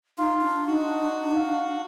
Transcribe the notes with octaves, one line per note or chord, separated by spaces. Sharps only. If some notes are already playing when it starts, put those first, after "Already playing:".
D#4 F4
D4
D#4 F#4
F5